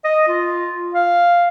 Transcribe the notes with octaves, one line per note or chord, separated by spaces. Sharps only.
D#5
F4
F5